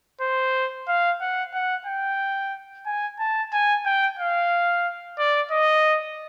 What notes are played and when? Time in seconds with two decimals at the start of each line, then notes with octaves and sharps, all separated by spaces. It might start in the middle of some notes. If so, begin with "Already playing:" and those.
0.21 C5
0.88 F5
1.21 F#5
1.54 F#5
1.86 G5
2.86 G#5
3.19 A5
3.53 G#5
3.86 G5
4.19 F5
5.18 D5
5.51 D#5